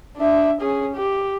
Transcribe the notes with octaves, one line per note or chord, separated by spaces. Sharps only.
D4 E5
C#4 G#4
G4